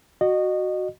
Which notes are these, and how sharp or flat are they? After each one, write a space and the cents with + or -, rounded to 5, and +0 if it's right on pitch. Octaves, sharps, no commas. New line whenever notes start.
F#4 +0 D#5 -25